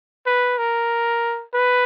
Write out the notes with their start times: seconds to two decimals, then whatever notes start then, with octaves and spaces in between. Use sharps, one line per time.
0.26 B4
0.58 A#4
1.54 B4